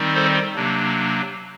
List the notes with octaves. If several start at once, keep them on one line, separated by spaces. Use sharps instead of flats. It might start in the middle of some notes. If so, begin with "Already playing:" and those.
Already playing: D#3 G3 C4 D#4
A4 C5
C3 F#3 A#3 D4